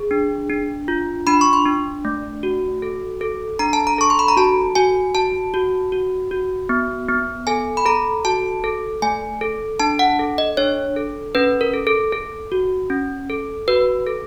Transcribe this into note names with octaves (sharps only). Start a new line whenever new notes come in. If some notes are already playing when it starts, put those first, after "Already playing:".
Already playing: G#4
D4
D4
F4
D4 B5
C#6
C6
D4
A3
F#4
A4
A4
D4 A#5
A5
A#5
A4 C#6
C6
B5
A#5
F#4 A5
F#4 G#5
F#4 A5
F#4
F#4
F#4
B3
B3
A4 G#5
B5
A4 A#5
F#4 A5
A4
A3 G#5
A4
D4 A5
F#5
A4
D#5
D4 C#5
A4
C#4 B4
A#4
A4
A4
A4
F#4
C#4
A4
F#4 B4
A4